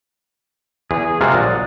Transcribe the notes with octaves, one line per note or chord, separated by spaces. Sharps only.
E2 G#4
C3 G#3 F4 F#4 A#4
A#1 F#3 D5 D#6